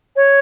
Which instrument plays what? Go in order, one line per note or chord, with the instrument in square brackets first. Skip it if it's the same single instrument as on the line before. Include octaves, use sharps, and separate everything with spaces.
[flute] C#5